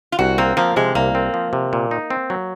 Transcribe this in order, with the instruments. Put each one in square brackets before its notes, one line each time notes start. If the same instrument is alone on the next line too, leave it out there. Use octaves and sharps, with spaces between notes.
[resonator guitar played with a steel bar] F4
[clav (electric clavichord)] C2 [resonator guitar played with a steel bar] F#4
[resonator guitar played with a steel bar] A#3 [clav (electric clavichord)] C4
[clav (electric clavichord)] F3 [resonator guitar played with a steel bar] A#3
[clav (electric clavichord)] C3 [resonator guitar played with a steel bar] G#3
[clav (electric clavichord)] C2 [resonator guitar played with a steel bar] A#3
[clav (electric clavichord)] C4
F3
C3
A#2
D#4
C4
F#3